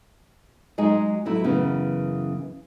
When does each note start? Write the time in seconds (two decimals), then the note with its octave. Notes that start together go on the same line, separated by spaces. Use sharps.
0.78 F#3 G#3 D#4 G#4
1.26 F#3 A3 E4
1.44 F#2 C#3 E3 B3